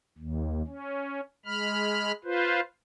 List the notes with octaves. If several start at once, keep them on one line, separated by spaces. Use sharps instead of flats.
D#2
C#4
G#3 B5 F6
F4 B4 C5